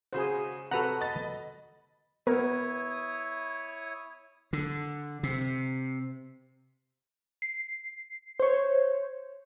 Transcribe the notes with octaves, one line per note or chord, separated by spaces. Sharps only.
C#3 F#4 G#4 C5
C3 F#4 A4 B4 F#5 A#5
D#5 B5 A6
B3 E4 A#4 C#5 D#6
D3
C3
C7
C5 C#5